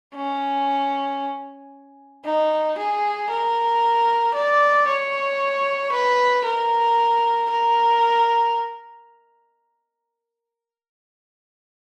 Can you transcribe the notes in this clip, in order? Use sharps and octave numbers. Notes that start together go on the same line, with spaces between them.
C#4
D#4
G#4
A#4
D5
C#5
B4
A#4
A#4